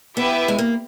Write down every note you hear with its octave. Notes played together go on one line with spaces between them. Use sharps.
B3 E4 G4 B4 E5 G5
G#3
A#3